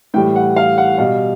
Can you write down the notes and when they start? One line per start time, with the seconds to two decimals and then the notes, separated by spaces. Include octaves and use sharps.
0.14 A2 E3 G3 G5
0.36 F#5
0.56 F5
0.78 F#5
0.98 B2 G3 F5